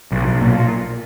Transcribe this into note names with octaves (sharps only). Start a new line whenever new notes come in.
B1
B1
A#2